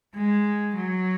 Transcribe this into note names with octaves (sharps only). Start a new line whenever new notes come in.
G#3
F#3